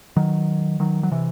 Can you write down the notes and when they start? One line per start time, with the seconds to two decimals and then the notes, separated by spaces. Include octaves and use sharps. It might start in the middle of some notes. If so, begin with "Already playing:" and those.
0.16 D#3 F#3
0.80 D#3 F#3
1.03 F#3
1.11 C3 E3